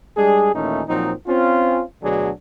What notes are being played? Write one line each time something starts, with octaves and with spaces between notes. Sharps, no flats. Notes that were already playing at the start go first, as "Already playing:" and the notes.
G3 G#3 D4 G#4
D#2 A#2 E3 A3 C#4 D#4
A#2 F3 F#3 C4 D#4
C4 C#4 F4
D2 B2 D3 F#3 D4 G#4